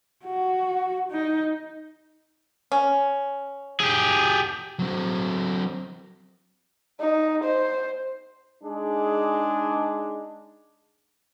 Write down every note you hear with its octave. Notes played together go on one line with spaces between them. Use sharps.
F#4
D#4
C#4
G4 G#4
F#3 C4
D#4
C5
G#3 D4 D#4 G#4